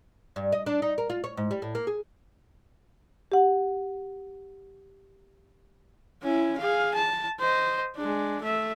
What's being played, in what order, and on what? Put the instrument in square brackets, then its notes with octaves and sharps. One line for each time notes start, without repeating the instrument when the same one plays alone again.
[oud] G2
D#5
D4
D#4
A#4
F4
C#5
G#2
G3
A2
A#3
G#4
[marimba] G4 F#5
[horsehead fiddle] C#4 E4
G#4 F5
A5
C5 D#5
G#3 D4
A3 E5